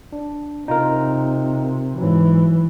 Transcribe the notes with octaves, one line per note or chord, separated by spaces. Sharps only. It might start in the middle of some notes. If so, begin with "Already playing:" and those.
D4
C3 D#4 F4 A#4
G#2 E3 F#3